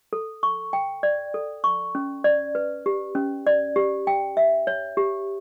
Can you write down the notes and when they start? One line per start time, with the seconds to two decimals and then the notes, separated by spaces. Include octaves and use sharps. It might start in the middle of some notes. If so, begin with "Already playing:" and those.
0.13 A4
0.43 C#6
0.73 G5
1.03 D5
1.34 A4
1.64 C#6
1.95 C#4
2.24 D5
2.55 B4
2.86 G4
3.15 C#4
3.47 D5
3.76 G4
4.07 G5
4.37 E5
4.67 C#5
4.97 G4